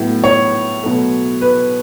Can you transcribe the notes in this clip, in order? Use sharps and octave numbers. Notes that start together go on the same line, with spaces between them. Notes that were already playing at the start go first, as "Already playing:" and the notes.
Already playing: A2 F#3 B3
C#5
B2 F#3 A3
B4